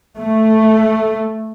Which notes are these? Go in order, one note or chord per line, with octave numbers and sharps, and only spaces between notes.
A3